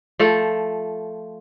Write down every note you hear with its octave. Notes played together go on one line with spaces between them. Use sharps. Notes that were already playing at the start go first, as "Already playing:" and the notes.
F3 A3 A4